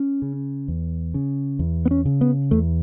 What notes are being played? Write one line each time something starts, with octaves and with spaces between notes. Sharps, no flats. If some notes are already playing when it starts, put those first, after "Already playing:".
Already playing: C#4
C#3
E2
C#3
E2
B3
C#4
C#3
B3
E2 A3